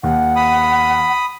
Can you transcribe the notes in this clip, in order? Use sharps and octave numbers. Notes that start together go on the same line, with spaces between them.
D#2 F#5
B5 D#6